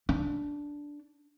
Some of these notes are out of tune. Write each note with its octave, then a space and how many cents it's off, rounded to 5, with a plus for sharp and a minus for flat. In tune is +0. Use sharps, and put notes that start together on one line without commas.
D4 -10